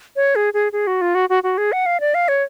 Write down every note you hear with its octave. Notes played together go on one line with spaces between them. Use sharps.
C#5
G#4
G#4
G#4
F#4
F4
F#4
F#4
F#4
G#4
F#5
F5
D5
F5
C#5